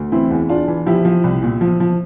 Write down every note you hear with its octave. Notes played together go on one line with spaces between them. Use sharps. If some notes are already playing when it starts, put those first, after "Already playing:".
Already playing: D2
E3 C4 E4
E2
E2 D4 F4
E3
F3 E4 G4
F3
C2
A#2
F3
F3